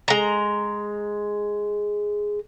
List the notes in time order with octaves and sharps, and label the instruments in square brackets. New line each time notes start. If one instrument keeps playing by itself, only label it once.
[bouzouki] G#3 A#5